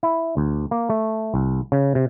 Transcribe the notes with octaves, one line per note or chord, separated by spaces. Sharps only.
E4
D2
A#3
A3
C2
C#3
C3